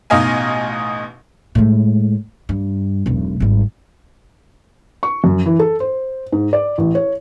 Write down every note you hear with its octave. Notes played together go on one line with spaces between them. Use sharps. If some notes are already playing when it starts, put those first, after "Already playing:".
A1 B2 D#4 D#5 F5 G#5
A2 G#3
G2
E1 B1
G#1 G3
C#6
F#2
E3
A4
C5
G#2
D5
A1
C#5